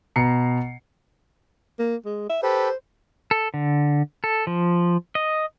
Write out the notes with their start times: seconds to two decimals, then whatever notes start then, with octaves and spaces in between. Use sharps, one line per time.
0.16 B2 A#5 C7 C#7
1.79 A#3
2.05 G#3
2.30 E5
2.43 G4 A4 B4 C5
3.31 A4
3.54 D3
4.24 A4
4.47 F3
5.15 D#5